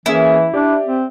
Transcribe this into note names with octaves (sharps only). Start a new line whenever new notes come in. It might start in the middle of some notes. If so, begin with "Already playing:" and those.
E3 A#3 C#4 E4 G#4
D4 G4 D5
C4